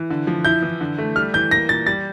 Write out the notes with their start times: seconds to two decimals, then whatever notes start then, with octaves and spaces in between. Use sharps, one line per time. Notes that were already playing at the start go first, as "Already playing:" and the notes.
Already playing: E3
0.10 D3
0.27 F3
0.45 E4 G6
0.63 E3
0.81 D3
0.98 A3
1.16 G3 F6
1.34 E3 G6
1.51 A#3 A#6
1.69 A#2 A6
1.86 G3 A6